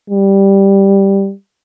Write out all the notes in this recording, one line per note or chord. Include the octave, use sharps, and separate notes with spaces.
G3